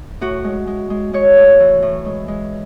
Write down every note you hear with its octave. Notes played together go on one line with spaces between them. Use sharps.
A2 F#4
G#3
G#3
G#3
G#3 C#5
A2
E3
A2
G#3
G#3